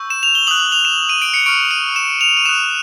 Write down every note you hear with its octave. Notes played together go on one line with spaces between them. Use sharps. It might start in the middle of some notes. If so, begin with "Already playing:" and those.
Already playing: C#6 E6 G6
E7
F7
G7
D#6 F#6 F#7
F#7
F7
E7
D#7
D7
C#7
C#6 F6 D7
D#7
E7
F7
D#7
D#6 F#6 E7